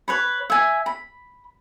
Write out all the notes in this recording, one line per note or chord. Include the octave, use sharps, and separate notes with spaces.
B4 C#5 B5
E5 G#5
B5